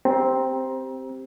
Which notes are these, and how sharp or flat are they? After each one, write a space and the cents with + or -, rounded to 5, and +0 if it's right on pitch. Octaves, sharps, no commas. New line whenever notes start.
C4 +0 G4 +0 A#5 +25